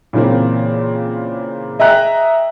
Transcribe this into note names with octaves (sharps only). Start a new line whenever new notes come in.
A#2 C#3 E3 A#3 C4
G#4 D#5 E5 G5 A#5 F#6